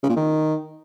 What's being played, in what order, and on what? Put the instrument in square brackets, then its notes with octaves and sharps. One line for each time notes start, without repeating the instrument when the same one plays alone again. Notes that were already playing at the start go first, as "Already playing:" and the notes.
[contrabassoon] C#3
A#2
D#3